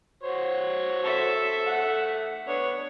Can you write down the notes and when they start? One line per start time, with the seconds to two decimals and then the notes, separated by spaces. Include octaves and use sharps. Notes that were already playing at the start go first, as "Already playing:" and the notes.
0.23 F#4 C5 C#5
1.03 A4 E5
1.67 A3 F#5
2.47 B3 D4 C#5